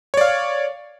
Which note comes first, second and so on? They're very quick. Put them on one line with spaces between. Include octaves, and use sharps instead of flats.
C#5 D5 F5